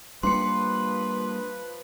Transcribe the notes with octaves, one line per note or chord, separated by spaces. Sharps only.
F3 G3 A#3 D4 B4 C6 C#7